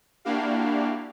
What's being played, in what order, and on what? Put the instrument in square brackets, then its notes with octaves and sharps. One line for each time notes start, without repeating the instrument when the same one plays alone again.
[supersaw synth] A#3 D4 E4 F#4 G4 F5